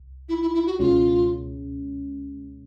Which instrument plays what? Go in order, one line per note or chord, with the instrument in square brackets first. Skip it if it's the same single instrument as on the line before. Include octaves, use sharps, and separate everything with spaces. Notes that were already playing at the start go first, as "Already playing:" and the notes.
Already playing: [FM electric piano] C2
[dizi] E4
E4
E4
F#4
[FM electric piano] C#2 B2 G#3 C#4 [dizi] F4